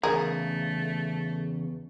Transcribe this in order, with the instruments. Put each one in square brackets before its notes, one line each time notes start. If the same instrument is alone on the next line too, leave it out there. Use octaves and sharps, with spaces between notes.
[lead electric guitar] E2 C#3 [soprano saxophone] A3 [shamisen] G#4 A#4